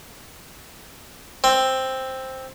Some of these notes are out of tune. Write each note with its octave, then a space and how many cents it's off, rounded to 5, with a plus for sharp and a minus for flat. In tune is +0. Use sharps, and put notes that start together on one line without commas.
C4 +5